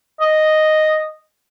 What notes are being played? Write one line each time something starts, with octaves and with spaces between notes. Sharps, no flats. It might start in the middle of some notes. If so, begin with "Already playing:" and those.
D#5